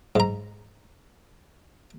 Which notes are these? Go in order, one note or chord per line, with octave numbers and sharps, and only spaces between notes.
G#2 A#5